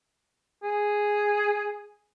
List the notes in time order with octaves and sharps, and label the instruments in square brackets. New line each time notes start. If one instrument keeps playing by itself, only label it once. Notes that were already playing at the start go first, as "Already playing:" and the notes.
[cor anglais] G#4